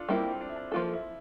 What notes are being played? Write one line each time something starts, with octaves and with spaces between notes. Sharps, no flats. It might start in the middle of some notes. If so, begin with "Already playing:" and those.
Already playing: D4 F4 A4
G3 A#3 C4 E4
D4
E4
D4
F3 A#3 E4 F4 A4
E4